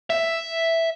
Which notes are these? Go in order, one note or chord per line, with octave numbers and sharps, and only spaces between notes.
E5